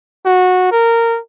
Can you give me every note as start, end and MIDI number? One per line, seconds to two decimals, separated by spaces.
0.26 0.68 66
0.72 1.19 70